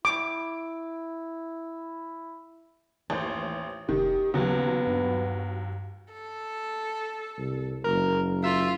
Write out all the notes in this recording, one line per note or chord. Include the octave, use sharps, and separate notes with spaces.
E4 D6
A1 D#2 C5
F1 D#3 G4
D#2 C#3 F#3 B3
G2
A4
C2
F#1 A#4
F4 E5